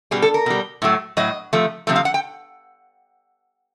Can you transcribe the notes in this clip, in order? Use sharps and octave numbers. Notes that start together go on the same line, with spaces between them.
B2 G3 G#4
A4
A#4
B2 G3
A2 F#3 A3
A2 F#3 D#5
C3 F3 A3
C3 F3 A3
F5
F#5
G5